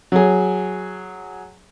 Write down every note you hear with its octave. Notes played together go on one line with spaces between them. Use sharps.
F#3 G#4